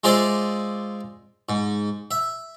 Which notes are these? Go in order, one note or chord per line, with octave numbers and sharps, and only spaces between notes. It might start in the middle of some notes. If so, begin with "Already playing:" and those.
G#3 F4 G#4 C5 D5 E5
G#2
E5